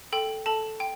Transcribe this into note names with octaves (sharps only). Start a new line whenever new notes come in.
A4 G5
A4 A5
G5